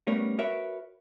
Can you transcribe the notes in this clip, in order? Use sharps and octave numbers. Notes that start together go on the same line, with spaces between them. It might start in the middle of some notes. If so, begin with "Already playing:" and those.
G3 A3 B3 C#4 A#4 C#5
F#4 A#4 B4 C#5 E5